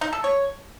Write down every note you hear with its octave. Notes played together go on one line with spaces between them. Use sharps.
D#4
A4
C#5